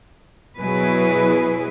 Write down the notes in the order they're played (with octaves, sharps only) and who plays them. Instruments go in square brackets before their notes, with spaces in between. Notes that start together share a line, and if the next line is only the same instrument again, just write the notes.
[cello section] B2 F#3 E4 G#4 B4